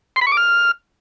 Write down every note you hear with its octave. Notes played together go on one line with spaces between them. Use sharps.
C6
B5
C#6
D6
F6